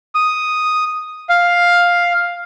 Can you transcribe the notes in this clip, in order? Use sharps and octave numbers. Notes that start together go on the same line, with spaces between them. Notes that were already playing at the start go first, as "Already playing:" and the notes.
D#6
F5